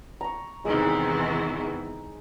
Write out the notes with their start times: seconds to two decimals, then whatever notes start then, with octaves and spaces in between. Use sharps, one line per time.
0.21 A#5 C#6
0.65 E2 C3 D#3 E3 G#3 D#4